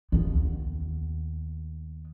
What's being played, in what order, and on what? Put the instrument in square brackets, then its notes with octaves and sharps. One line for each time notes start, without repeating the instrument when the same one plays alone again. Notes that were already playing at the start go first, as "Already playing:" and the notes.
[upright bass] D#2 B3